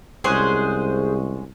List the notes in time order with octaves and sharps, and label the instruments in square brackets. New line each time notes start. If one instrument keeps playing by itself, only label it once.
[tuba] C2 [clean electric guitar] G#3 C#4 F#4 [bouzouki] G#4 C5